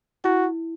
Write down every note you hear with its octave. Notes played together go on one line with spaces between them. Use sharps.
E4 F#4